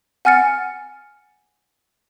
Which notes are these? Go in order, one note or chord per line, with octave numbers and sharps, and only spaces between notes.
F#5 G#5 F6 A6 C#7